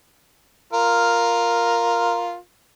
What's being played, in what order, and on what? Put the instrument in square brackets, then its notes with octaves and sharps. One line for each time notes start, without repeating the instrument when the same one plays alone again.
[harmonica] F4 A#4